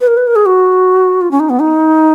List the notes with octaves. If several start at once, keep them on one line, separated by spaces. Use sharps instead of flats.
B4
A#4
B4
A#4
G#4
F#4
F4
C#4
D#4
B3
D#4